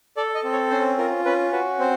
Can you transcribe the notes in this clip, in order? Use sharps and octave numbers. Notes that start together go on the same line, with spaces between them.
A4 D5
D#5
C4
C#5
C#4 C5
F4 A#4
C#4 B4
F#4 B4
C4 C5